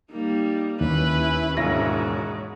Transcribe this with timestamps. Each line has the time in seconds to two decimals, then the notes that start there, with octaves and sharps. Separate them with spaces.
0.11 G3 A#3 D#4
0.81 D#2 C#4 E4 B4
1.57 E1 G#2 G#3 E4 F#4 C#5 A#6